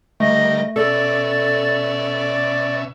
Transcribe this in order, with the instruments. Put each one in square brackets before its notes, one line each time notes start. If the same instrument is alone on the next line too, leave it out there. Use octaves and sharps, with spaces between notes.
[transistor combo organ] D3 G3 A#4 [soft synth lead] A3 [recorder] D#5
[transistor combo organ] B2 C#4 E5 [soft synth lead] A4 [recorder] D5